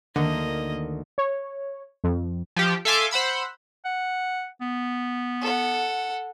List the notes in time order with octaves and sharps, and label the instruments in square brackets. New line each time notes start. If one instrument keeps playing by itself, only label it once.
[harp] D2 D#3 [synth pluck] D3 [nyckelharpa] A#3 D#5
[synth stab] C#5
F2
[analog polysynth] F3 G4
A4 E5 F5 G#5 C6 D6
C5 F#5 B5 E6
[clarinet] F#5
B3
[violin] A4 F#5